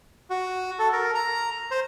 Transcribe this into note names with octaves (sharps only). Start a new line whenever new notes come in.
F#4
A4
A#4
A#5
C5